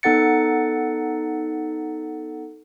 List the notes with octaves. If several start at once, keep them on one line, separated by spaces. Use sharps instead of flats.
B3 D#4 A4 F#5 A6 C#7